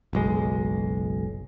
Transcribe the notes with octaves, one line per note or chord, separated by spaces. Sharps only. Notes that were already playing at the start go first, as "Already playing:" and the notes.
F#1 B1 G#3